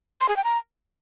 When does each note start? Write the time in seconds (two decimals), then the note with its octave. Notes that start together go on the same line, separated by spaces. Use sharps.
0.21 C6
0.29 G#4
0.36 G5
0.44 A#5